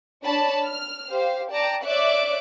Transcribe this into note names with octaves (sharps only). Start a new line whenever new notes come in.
D4 C#5 A5 B5
F6
G4 C5 F5
D5 G5 A5 A#5 D6
C#5 D5 E5 D6 F#6